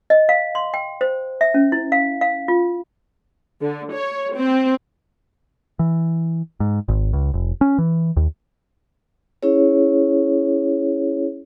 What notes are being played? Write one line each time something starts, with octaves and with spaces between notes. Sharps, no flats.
D#5
F5
C6
G5
C5
E5
C#4
E4
F5
F5
F4
D3
C#5
C4
E3
G#2
G#1
C#2
F1
C#4
E3
D#2
C#4 E4 G#4 C#5